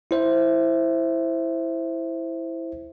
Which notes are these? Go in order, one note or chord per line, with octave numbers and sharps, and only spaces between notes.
E4 C5 E5